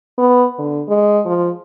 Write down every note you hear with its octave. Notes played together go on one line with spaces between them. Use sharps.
B3
D3
G#3
F3